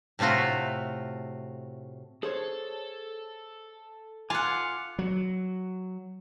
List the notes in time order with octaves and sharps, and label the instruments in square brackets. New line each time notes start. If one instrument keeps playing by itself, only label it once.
[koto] A2 C3 A3 F4 F#4
[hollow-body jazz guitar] G#4 C5 C#5 [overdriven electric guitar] A4
[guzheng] F4 F#5 [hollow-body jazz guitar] G#5 [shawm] D6
[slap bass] F#3